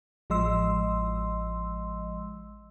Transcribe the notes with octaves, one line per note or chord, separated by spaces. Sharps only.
A1 F3 G#3 D#5 C6 E6